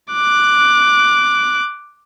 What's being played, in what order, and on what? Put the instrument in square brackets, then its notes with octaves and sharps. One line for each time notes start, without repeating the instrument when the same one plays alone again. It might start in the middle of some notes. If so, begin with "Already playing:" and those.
[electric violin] D6 F#6